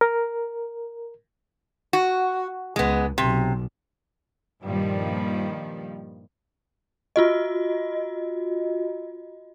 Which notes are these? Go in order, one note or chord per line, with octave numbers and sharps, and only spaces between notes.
A#4
F#4
C#2 G#3 B3
B1 C3
G2 A#2 D#3 F3 G3
F4 F#4 D#5